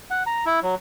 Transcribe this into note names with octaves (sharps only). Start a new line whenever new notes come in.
F#5
A#5
E4
F#3